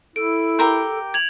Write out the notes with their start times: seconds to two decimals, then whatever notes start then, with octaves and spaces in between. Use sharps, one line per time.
0.16 E4 A4 D7
0.59 G4 A#4 C6 G6
1.14 G#6 F7 F#7